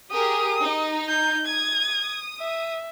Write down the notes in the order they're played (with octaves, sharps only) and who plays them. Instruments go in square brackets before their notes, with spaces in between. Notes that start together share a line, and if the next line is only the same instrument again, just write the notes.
[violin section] G4 G#4 A#4 [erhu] D#6
[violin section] D#4
[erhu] G6
[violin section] D#6 [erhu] G#6
[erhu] E5